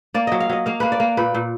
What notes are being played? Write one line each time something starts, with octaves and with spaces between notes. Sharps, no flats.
A#3 D5
F#3 D#5
F5
F#3 D#5
A#3 F5
A#3 B4
D5
A#3
A#2 B4
A#2